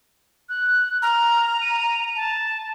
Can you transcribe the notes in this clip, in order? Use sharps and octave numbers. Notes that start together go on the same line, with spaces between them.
F#6
A#5 F6
D#7
A5